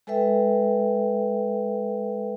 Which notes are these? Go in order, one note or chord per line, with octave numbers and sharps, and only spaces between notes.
G#3 A4 B4 E5 G5